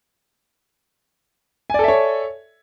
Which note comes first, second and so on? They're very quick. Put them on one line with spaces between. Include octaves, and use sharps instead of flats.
G#5 D5 A4 E5 C#5